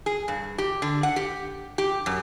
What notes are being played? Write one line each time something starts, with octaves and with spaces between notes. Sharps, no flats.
G#4
G2
G4
D3
F#5
G4
G4
F#2